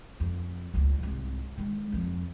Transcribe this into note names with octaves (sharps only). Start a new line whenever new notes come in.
F2
C#2 A3
C2 G#2
D#3 G#3
F2 F3